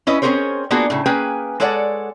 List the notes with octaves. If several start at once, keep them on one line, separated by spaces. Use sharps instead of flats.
C#4 E4 B4 D#5
C4 C#4 G#4 A#4 C5 C#5
A#3 B3 D4 F4 F#4 G#4
A2 C#3
A#3 C#4 G#4 B4 G5 G#5
G#3 A4 C#5 D5 F5 F#5